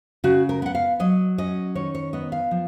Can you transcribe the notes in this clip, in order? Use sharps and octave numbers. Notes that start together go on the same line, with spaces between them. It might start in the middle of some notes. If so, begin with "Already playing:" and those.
C#3 F#4
A#4
B3 F#5
F5
F#3 D#5
C#4 D#5
D#3 C#5
C#5
B3 D#5
F5
F3